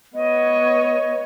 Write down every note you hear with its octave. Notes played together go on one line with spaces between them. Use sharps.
B3 C#5 D#5